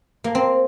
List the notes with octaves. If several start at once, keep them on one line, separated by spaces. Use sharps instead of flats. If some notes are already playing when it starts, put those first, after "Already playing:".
A#3
C4